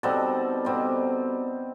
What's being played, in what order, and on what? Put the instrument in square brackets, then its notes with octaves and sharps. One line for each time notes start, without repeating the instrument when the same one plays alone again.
[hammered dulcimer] B2 G3 C4 D#4 A4
B2 G3 C4 D#4